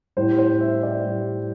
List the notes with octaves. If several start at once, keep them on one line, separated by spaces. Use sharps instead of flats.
A2 G3 C5
C5
E5
D5
A2 G3